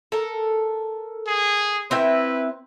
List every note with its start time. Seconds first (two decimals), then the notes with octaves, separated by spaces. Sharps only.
0.12 A4 A#4
1.27 G#4
1.91 C4 E4 B4 G5